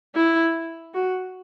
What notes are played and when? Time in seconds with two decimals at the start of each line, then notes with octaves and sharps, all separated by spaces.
0.15 E4
0.95 F#4